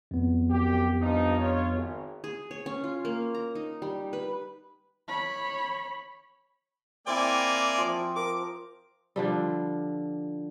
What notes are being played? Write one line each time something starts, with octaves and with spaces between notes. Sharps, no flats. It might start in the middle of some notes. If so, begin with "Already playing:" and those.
F2 B3
F#2 G4
G2 F3 D#4
G2 F4 C#5
G#1
G#4
C#5
C#4
F4
A#3
A#5
D#4
G3
B4
C#5 B5
A#3 C4 E4 D5 G#5
F3 F4
A#4 D6
D3 F3 G3